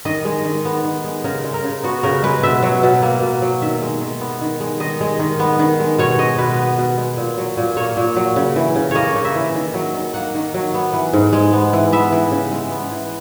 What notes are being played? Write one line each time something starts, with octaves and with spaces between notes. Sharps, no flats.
D#3 D#5
G#3
D#3
B3
D#3
G#3
C#3 A#4
G#3
A#4
C#3
B3 F#4
C#3 A#4
G#3 B4
B2 E5
F#3
B2
A#3
B2
F#3
D#3 E5
G#3
D#3
B3
D#3
G#3
D#3 D#5
G#3
D#3
B3
D#3
G#3
B2 C#5
G#3 D#5
B2 B4
B3 B4
B2
G#3
A#2
F#3
A#2
A#3 C#5
A#2
F#3
C#3
E3
C#3
A#3 C#5 D#5
C#3
E5
E3
D#3
F#3
D#3
A#3 F#5
D#3
F#3
B3
E3
G#2
G#3
B3
E3
B3 E5
E3
C#3
G#3
B3
E3